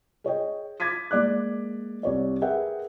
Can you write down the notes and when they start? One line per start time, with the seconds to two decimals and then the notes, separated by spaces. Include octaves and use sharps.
0.24 G#4 C#5 D#5 G5
0.80 D6 G#6 A6 B6 D#7
1.11 G#3 A#3 D5 D6 F#6
2.03 C2 C#5 D5
2.42 G#4 A#4 B4 E5 F#5 G5